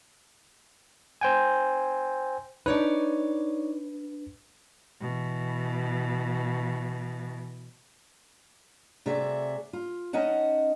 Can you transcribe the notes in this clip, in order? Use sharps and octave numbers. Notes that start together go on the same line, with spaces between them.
C5 G5 G#5
D4 D#4 B4 C#5 D5
B2 E3
C3 A3 F#4 G#4 D5 E5
F4
C#4 D#4 D#5 F#5 A5